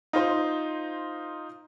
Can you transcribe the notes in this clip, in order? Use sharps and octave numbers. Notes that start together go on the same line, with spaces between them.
D#4 F4 C5 C6